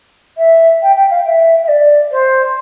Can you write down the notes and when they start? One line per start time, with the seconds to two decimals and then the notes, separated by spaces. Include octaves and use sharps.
0.38 E5
0.82 G5
0.96 G5
1.10 F5
1.25 E5
1.63 E5
1.68 D5
2.11 C5